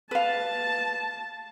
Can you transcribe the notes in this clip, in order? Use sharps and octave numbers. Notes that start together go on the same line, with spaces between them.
B4 F5 A5